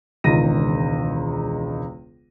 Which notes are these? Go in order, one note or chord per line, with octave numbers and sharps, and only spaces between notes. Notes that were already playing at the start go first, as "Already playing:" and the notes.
E1 C#2 D#3 A#6 D#7